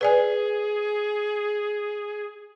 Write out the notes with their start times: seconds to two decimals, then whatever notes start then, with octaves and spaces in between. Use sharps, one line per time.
0.01 G#4 B4 D5 G#5